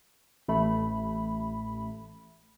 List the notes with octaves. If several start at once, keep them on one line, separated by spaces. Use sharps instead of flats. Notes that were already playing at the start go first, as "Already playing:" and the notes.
A1 A3 B5